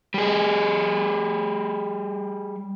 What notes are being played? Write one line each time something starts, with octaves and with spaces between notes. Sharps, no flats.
G3 G#4